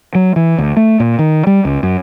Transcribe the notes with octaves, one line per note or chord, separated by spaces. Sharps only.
F#3
E3
D2
A3
A#2
D#3
G3
C#2
F#2